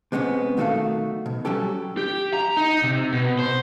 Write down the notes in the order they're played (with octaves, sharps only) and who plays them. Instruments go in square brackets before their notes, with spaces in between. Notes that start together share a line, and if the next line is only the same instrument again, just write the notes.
[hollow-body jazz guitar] C3 G#3 A#3 B3 C#4
B1 D#3 A3 F#4 A4 F5
B2
F#3 G3 C#4 G4 A4
[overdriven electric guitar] G4
A#5
D#4
C3
B2
C5